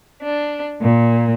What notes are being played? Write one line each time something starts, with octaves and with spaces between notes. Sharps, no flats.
D4
A#2